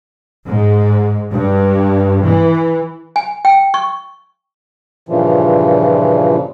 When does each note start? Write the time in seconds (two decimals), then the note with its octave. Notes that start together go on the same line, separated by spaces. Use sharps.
0.47 G#2
1.32 G2
2.26 E3
3.16 G#5
3.45 G5
3.74 C#6
5.09 G2 A#2 C#3 E3 F3